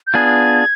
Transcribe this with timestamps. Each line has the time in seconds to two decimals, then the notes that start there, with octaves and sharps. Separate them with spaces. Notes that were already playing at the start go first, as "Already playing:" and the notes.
0.07 G6
0.14 B3 D4 F4 G#4 G#6